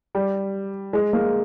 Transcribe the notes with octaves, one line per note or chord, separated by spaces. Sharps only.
G3
G#3
A#3